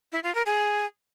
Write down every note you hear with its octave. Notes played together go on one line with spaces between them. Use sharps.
E4
F4
A#4
G#4